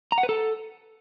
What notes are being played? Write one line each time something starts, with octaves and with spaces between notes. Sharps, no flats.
A#5
F#5
B4
A4